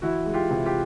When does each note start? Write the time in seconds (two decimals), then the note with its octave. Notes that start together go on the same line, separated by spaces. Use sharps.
0.02 E3 E4 F#4
0.26 G#3
0.34 F4 G4
0.50 C3
0.65 F4 G4